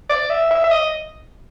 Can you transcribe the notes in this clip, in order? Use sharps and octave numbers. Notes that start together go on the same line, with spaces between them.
D5
E5
E5
E5
D#5